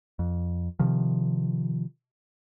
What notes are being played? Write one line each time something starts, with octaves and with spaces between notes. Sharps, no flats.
F2
C3 D#3 F3